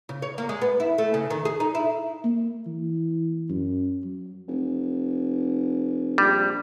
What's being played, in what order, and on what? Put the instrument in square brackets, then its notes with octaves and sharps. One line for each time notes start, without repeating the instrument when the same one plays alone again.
[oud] C#3
C#5
A#3
G#3
B3
E4
A3
C#3
D#3
G#4
D#4
E4
[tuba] A#3
E3
F#2
F#3
[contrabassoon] F1
[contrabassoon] A#1 [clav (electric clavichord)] G3